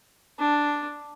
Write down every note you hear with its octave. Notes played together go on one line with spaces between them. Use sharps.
D4